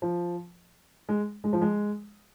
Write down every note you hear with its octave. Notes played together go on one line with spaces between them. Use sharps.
F3
G#3
G#3
F3
G#3